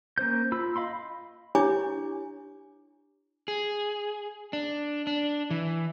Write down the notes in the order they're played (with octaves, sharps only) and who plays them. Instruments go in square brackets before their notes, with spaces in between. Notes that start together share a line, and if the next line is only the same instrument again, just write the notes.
[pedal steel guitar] A#3 C#4 C5 G6
F4 B5 E6
D#5 F5 B5 C6
[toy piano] D4 E4 G4 C#5 G#5 D6
[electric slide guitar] G#4
D4
D4
E3